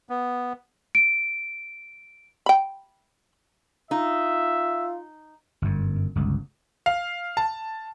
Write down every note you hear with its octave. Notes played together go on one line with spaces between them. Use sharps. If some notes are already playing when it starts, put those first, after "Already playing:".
B3
D7
G5 B5
D#4 F4 E5
G1 F#2
G1 C#2
F5
A5